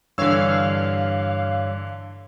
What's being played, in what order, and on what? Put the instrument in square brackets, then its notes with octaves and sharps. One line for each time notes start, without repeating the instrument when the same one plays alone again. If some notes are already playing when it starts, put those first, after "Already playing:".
[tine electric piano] G2 C#5 [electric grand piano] D3 E3 E6 [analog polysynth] F5